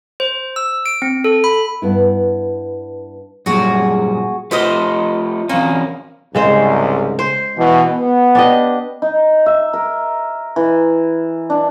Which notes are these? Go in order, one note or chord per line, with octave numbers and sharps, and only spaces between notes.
C5
E6
D7
C4
A4
B5
G2 B3 E4
F#2 A#2 G3 F#4 G#4
A3 F4 G4 B4 C5 D#5
E3 A#3 C4 C#4
C2 G#2 C#3 G#3 C5
C5
B2 E3
B3
D4 G4 D#5
D#4
E5
A#4
E3
D4